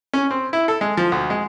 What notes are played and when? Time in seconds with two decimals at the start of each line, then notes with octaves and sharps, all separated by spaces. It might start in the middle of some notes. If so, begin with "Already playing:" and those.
0.13 C#4
0.31 C4
0.53 E4
0.68 A4
0.81 G#3
0.97 F3
1.12 D2
1.30 G#3